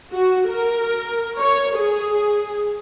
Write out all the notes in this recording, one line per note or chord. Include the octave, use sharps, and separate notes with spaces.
F#4
A#4
C#5
G#4